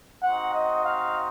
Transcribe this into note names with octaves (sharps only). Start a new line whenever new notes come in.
C4 D#4 F#4 F#5
D#5
F5